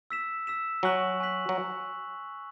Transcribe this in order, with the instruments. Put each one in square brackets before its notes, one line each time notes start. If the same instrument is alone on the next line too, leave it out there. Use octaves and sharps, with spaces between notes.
[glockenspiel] E6 B6 E7
E6 B6 E7
[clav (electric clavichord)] F#3 [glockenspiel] G#5 C#6 F#6 B6 F#7
[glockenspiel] G#5 C#6 F#6 B6 F#7
[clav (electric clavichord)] F#3